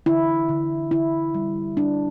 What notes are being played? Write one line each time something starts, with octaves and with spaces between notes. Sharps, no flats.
D3 E4
D3
D3 E4
G3
G3 D4